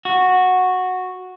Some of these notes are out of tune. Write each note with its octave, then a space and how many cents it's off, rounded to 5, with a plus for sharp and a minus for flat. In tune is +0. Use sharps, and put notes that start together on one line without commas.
F#4 -10